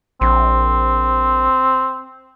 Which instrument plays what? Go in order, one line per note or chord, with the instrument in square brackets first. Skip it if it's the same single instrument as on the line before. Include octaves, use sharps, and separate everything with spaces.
[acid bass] A#1 [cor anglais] C4